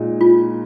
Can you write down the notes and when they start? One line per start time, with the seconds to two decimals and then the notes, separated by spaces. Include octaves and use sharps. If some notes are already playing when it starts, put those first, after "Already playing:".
Already playing: A#2 G#3 D#4
0.21 F4